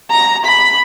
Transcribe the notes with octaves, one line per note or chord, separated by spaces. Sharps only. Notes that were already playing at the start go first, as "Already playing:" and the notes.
A#5
B5